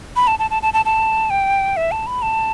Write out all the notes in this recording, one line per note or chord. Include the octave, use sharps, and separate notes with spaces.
B5
A5
A5
A5
A5
A5
A5
G5
E5
A5
B5
A5